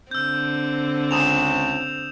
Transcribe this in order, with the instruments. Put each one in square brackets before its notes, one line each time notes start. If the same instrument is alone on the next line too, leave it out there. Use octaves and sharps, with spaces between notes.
[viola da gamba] D3 C4 [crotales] E6 G6
[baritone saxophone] C#2 [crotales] D#6 E7 F7